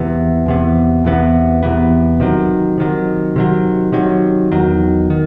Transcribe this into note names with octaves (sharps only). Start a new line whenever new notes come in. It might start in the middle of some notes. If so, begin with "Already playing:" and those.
Already playing: E2 C3 E3 B3
E2 C3 E3 B3
E2 C3 E3 B3
E2 C3 E3 B3
C3 D#3 F#3
C3 D#3 F#3
C3 D#3 F#3
C3 D#3 F#3
E2 D#3 F#3
D#3